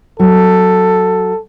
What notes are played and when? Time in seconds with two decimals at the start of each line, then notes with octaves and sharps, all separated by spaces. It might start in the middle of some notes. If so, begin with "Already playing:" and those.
0.20 F#3 A4